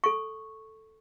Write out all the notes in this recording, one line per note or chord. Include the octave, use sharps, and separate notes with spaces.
A4 C#6